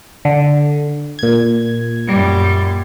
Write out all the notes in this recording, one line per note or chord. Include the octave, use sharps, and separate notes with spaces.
D3
A#2 G#6
F#2 G3